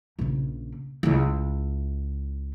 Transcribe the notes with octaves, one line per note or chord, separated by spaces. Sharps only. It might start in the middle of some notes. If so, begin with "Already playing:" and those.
A#1 C#3
C#2 E4